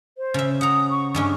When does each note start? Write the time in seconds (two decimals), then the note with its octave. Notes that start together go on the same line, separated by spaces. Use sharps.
0.18 C5
0.34 C#3 E5
0.61 F#5 A#5 D#6
0.91 C#6
1.15 G2 G#3 C#4